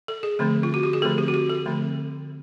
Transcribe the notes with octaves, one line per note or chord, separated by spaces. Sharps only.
A4
G#4
D3 F3 A3 C4
F4
F#4
G4
G#4
D3 F3 A3 C4 A4
G4
F#4
G4
A4
D3 F3 A3 C4